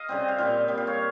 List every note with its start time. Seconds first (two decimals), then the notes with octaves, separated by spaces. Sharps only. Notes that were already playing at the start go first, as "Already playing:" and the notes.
Already playing: D#5 F5
0.09 C#3 G3 C4
0.28 F5
0.38 A#2 G3 C4
0.68 A#2 G3 C4
0.78 F5
0.87 C#5